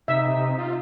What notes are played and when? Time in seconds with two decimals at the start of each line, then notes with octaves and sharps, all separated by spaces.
0.08 C3 D#4 E5
0.58 F4